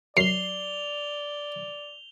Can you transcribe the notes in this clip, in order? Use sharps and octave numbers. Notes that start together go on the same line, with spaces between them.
F#2 D5 C7 F7 G7